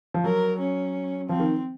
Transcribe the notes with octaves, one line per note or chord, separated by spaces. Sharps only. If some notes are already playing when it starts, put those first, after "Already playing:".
F3
F#3 A#4
C#4
F3 C4
D#3